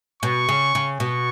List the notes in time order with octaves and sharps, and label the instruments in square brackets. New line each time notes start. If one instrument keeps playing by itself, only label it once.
[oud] B2 [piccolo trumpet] C#6
[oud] C#3
C#3
[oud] B2 [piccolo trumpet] C#6